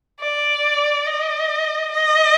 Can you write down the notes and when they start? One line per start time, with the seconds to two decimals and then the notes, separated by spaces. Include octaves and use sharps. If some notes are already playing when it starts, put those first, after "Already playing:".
0.20 D5
1.06 D#5
1.92 D#5